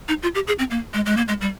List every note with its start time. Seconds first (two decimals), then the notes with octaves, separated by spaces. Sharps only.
0.08 D#4
0.23 F4
0.35 G4
0.47 G#4
0.59 C4
0.71 A#3
0.94 G#3
1.06 G#3
1.17 A#3
1.28 G#3
1.41 G3